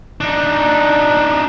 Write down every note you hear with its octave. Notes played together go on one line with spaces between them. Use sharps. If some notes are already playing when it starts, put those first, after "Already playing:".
D4 D#4